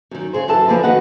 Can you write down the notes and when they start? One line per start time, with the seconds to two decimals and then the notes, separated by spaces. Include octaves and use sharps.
0.11 F#2 D#3
0.33 C#3 G#4 C5
0.48 F#2 E3 A4 A5
0.68 D3 F3 A#3 G#4 B4
0.84 D#3 F#4 B4 D#5 F#5